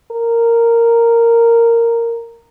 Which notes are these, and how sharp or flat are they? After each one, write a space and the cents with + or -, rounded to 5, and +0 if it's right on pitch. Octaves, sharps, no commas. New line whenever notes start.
A#4 -10